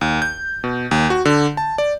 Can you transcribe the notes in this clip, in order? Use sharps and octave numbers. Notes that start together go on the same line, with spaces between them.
D#2
G6
B2
D#2
F#4
D3
A5
D5